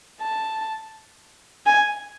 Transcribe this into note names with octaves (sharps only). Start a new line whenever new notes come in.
A5
G#5